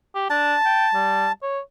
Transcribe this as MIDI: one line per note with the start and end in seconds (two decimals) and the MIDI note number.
0.15 0.27 67
0.30 0.55 62
0.30 1.32 81
0.65 0.87 79
0.94 1.28 55
1.42 1.59 73